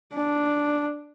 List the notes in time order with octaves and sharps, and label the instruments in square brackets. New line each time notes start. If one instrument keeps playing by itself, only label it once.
[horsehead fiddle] D4